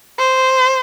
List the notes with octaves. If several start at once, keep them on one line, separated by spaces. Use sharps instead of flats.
C5